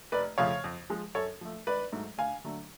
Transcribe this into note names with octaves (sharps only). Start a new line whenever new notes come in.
F1 B4 D5
F2 C#3 F3 A3 C#5 F5
F2
F3 G#3
F#2 A4 C#5
F3 A3
G#1 B4 D5
G#2 F#3 A3
D2 F5 G#5
D3 F#3 A3